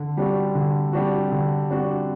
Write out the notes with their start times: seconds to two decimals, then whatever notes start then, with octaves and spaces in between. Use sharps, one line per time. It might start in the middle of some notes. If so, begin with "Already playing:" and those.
Already playing: D3
0.17 G3 D4 F#4
0.55 D3
0.93 G3 D4 F#4
1.32 D3
1.69 G3 D4 F#4